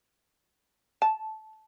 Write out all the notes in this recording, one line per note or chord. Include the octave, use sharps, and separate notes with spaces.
A5